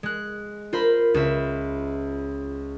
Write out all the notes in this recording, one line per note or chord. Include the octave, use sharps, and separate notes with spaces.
G#3 F#6
F4 A#4 C5 B5
C#2 E5